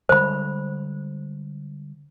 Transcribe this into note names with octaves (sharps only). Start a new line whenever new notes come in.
D3 G3 G#3 C5 B5